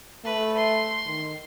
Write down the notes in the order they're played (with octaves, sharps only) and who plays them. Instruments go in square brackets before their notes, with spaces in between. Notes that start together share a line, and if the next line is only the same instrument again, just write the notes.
[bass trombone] A3 [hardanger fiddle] B4
[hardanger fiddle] C6
[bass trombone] D#3